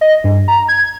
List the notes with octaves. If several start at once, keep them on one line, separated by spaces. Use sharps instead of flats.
D#5
G2
A#5
G#6